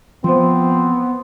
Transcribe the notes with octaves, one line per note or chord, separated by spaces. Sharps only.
F3 B3 C4 C5 C6